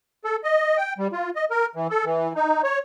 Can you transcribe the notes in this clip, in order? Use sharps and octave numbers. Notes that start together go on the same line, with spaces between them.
A4
D#5
G5
G3
F4
D#5
A#4
E3
A4
E3
D#4
C#5